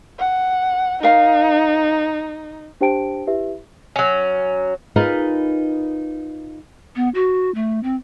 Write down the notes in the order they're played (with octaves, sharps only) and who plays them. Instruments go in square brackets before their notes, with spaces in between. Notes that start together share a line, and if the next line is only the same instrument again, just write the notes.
[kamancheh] F#5
[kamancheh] D#4 [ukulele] A#4 F5
[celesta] D4 G4 C5 G5 A5 D7
E4 G4 B4 E5
[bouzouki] F#3 C#4
[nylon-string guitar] D#4 F4 G#4 A#4 B4 D#5
[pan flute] B3
F#4
A3
C4